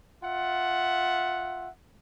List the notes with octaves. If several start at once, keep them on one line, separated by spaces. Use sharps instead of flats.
F4 E5 F#5